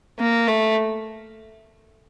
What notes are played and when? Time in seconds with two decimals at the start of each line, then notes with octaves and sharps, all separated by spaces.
0.19 A#3
0.48 A3